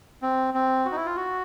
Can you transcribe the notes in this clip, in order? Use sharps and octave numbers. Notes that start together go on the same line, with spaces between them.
C4
C4
F#4
D#4
E4
F4
F#4